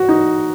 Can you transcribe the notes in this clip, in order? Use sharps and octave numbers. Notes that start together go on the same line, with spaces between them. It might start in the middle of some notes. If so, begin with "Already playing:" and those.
Already playing: F#4
D#4